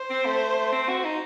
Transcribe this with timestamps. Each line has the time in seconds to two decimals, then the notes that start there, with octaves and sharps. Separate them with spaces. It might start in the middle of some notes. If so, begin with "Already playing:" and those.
Already playing: C5
0.10 C4
0.25 A3
0.72 C4
0.89 F#4
1.04 D#4